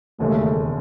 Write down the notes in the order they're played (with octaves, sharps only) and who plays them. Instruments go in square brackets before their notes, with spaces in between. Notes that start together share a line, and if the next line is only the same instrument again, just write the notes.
[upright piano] E1 D#2 C#3 G#3 C#4 [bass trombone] A3